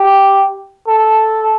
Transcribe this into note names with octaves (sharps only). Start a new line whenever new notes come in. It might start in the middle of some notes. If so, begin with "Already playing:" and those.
Already playing: G4
A4